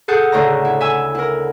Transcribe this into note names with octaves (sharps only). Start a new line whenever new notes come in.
G#4 A4 F#5 G6
D2 A2 C#3 A#5
E4
E5 G#5 E6
E4 A#4